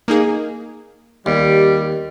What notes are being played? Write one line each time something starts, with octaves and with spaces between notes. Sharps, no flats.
A#3 D#4 G#4
D#2 G3